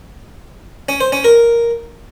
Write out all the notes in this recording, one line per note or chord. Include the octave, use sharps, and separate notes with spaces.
C#4
C5
C#4
A#4